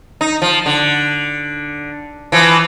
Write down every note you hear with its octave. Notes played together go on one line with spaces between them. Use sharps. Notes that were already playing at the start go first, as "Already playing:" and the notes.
D#4
F3
D3
E3 F3